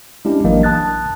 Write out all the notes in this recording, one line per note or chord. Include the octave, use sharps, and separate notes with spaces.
G#3 C#4 D4 E4 G4
A1 E3 F#3 A#3 D4 D#5
A5 D#6 F#6 A6